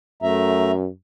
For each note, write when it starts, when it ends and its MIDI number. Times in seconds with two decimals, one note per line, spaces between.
0.23 0.88 42
0.23 0.72 57
0.23 0.72 76
0.23 0.72 82